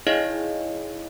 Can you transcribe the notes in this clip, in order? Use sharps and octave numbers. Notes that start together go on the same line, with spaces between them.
D#4 E4 G#4 C#5 D#5 F5